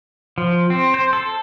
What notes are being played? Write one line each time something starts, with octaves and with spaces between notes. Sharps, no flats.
F3
C4
C5
A4